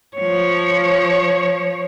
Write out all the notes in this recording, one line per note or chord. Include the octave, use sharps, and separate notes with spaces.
F3 C#5